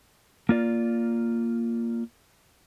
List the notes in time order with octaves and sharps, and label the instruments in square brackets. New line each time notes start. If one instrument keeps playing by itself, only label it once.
[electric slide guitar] A#3 F4 D5